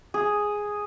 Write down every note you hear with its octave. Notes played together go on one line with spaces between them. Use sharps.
G#4